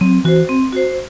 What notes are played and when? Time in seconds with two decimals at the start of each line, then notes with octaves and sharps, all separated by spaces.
0.01 F#3 C4
0.24 E3 F#4 C5
0.49 C4
0.73 F#4 C5